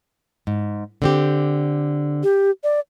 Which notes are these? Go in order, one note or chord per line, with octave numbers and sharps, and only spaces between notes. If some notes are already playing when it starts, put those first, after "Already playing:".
G#2
D3 C4 G4
G4
D5